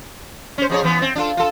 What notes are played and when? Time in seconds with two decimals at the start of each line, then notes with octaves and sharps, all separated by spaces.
0.58 C#4 C5
0.70 F2 G#4 C#5
0.84 E3 B3
1.02 C4
1.15 D4 F4 A4
1.37 F4 A4